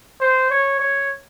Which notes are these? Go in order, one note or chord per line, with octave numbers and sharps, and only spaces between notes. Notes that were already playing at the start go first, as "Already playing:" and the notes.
C5
C#5
C#5